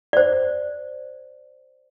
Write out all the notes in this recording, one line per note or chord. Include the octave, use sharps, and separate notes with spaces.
C5 D5